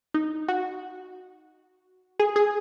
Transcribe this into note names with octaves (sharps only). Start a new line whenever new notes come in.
D#4
F#4
G#4
G#4